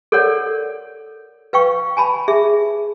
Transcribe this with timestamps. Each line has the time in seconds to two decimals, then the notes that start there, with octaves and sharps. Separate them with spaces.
0.12 A4 A#4 C#5 D5 F#5
1.53 B4 F5 G5 C#6
1.97 G#5 A5 B5
2.28 G#4 E5